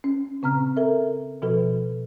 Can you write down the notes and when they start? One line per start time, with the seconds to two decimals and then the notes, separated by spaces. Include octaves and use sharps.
0.04 C#4
0.42 A#2 C#3 C4 A#5 F6
0.77 A4 A#4 E5
1.42 B2 F3 F#4 A4 B4